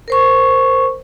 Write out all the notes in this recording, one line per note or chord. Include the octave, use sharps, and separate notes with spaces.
A#4 C5 C#6